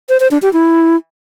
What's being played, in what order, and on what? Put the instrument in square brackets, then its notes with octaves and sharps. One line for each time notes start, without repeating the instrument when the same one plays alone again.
[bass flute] C5
C5
D4
G4
E4